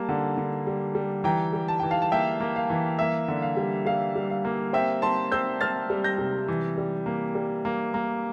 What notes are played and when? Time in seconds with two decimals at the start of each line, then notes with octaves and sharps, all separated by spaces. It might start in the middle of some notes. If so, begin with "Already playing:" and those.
Already playing: G3 A#3 A5
0.09 D3
0.38 D3
0.67 G3
0.95 G3
1.24 E3 G5 A#5
1.53 G3
1.68 A5
1.80 E3 G5
1.91 F5 A5
2.02 A5
2.12 A#3 E5 G5
2.40 A#3
2.56 F5
2.70 E3
2.99 A#3 E5
3.28 D3
3.42 F5
3.57 G3
3.86 G3 F5
4.15 G3
4.30 F5
4.45 A#3
4.73 C4 E5 G5
5.02 C4 A5 C6
5.32 C4 E6 G6
5.61 C4 F6 A6
5.90 G3
6.04 G6 A#6
6.18 C3
6.48 E3
6.77 G3
7.06 A#3
7.35 G3
7.65 A#3
7.94 A#3